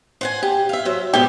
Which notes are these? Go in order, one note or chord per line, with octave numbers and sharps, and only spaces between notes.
C5 F#5 G#5
G4
E5 F5
F#3 C5
G#2 B2 G4